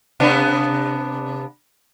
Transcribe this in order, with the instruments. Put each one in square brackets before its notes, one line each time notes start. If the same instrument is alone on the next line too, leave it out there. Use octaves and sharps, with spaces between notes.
[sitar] C3 B3 D4